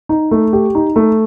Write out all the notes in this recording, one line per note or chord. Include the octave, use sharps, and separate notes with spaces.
D#4
A3
G4
D#4
A3